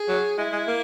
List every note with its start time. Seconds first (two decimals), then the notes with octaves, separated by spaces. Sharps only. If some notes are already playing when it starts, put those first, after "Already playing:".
Already playing: G#4
0.08 F#3
0.38 G#3 E4
0.52 G#3
0.68 A#3